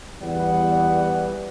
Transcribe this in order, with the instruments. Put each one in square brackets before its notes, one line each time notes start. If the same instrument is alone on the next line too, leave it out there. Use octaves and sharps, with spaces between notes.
[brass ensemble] E2 E3 G3 B3 F#5